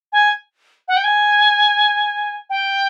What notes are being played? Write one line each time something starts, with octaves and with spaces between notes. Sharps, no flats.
G#5
F#5
G5
G#5
G5